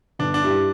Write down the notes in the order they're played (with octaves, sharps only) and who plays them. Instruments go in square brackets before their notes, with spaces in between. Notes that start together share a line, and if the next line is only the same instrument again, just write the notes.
[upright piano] G1 [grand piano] D4
[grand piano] D4
[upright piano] G2 G3 E4